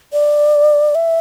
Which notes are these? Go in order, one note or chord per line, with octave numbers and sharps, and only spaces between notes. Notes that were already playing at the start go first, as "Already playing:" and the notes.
D5
E5